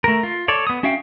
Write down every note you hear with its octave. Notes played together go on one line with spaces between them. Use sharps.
A3 A#4
F4
A4 C#5 D5
B3 D#6
C#4 F#4 E5 F5 G5